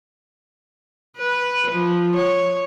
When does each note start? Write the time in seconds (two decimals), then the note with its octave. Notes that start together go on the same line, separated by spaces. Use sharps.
1.18 B4
1.71 F3
2.16 C#5